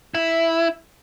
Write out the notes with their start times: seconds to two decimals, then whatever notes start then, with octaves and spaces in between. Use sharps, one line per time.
0.15 E4